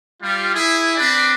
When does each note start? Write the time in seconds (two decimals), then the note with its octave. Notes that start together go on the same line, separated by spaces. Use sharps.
0.21 G3 F4
0.55 E4 G#4
0.97 C4 D4 B4 D5